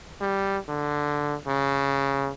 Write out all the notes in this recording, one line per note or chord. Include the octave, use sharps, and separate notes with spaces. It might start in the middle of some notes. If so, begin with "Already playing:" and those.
G3
D3
C#3